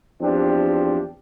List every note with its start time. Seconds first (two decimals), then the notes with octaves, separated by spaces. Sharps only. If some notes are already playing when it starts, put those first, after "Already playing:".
0.22 E2 F3 C4 D4 G4